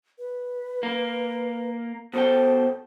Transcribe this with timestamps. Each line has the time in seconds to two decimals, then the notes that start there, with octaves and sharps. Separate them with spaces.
0.19 B4
0.83 A#3
2.14 B2 A4 C5 G5